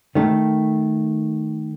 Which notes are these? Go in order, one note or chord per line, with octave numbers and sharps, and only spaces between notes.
D#3 A3 A4